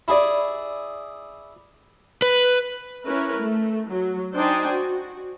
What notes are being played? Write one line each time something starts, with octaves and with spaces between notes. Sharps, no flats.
E4 G#4 D5
B4
C#4 E4 A#4 B4
A3
F#3
D4 D#4 C5 D5 G5 G#5
F#4